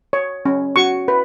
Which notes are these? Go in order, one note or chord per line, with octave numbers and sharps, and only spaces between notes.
C#5
C#4
F#4 C#6
B4